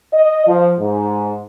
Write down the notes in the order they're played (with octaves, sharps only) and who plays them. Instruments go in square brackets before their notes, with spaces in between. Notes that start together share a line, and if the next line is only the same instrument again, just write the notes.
[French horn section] D#5
F3
G#2